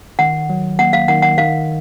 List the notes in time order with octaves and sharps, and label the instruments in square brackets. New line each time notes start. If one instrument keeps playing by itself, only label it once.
[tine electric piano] D#3 [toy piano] F#5
[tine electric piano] F#3
[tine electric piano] A#3 [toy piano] F#5
[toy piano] F5
[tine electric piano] D#3 [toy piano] F#5
[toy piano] F#5
[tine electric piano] D#3 [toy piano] F5